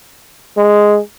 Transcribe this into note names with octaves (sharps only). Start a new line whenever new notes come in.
G#3